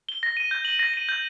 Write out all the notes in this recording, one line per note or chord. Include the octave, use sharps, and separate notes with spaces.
G7
A#6
D#7
G6
F#7
A#6
D#7
G6